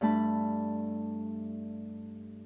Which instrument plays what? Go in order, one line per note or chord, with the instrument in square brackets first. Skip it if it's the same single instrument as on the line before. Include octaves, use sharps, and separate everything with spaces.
[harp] G2 A3 D4 A5 B5